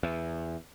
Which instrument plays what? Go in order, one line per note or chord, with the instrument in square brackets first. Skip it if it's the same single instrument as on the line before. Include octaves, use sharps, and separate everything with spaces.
[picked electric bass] E2